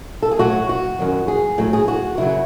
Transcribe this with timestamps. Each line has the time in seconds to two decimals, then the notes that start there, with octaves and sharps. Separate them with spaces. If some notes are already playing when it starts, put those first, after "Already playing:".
0.22 A4
0.31 G#4
0.39 A2 F#3 F#4
0.69 F#4
0.99 F#2 D#3 F#3
1.28 G#4
1.58 A2 F#3
1.73 G#4
1.88 F#4
2.17 F#2 C#3 F#3 E4